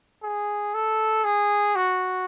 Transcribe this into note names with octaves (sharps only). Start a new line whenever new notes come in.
G#4
A4
G#4
F#4